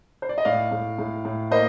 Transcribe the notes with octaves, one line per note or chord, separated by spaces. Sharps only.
C5
D5
D#5
A2 D5 F5
A2
A2
A2
A#3 C5 D#5